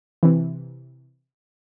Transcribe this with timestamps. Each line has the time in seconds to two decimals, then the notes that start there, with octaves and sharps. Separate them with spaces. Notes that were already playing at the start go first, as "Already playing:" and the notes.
0.23 C3 E3